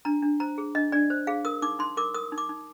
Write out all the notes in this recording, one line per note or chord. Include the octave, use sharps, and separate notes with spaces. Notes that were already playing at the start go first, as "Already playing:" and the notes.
D4 A#5
D4
C5 A#5
G#4
D4 D#5
D4 D5
C5
G#4 F5
A#4 D#6
D#4 D6
D#4 C6
A#4 D6
A#4 D#6
D#4
D6
D#4